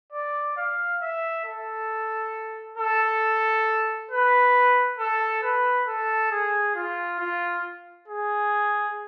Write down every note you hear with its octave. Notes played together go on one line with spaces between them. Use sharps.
D5
F5
E5
A4
A4
B4
A4
B4
A4
G#4
F4
F4
G#4